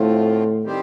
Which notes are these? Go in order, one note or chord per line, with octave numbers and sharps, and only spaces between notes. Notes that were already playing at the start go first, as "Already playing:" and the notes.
Already playing: A2 D3 F3 A3 C4 F4
D#3 G3 C4 G4 C5